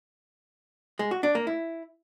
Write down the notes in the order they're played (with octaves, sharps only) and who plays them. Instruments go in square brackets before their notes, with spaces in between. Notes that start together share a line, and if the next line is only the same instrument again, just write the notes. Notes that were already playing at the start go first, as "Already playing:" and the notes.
[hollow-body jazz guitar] G#3
F#4
D4
A#3
E4